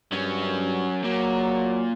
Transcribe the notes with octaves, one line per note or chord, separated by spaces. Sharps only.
G2 F#3 C#4
A#2 F#3